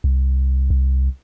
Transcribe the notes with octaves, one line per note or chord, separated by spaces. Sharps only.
C2
C2